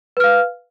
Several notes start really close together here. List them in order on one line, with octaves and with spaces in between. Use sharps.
B4 F6 F5